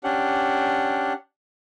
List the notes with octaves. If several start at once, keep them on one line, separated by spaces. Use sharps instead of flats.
C#4 D4 G4 F#5